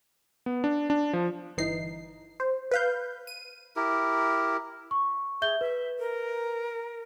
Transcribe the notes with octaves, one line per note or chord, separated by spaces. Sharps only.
B3
D4
D4
F3
G1 E3 D#4 C7
C5
B4 F5 G6
D#7
E4 G4 A#4
C#6
G#4 E5 G6 G7
B4 E5
A#4